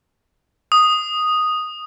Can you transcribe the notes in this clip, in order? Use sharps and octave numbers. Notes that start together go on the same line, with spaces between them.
D#6